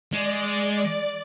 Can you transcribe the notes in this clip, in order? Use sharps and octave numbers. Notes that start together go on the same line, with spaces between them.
G#3 D5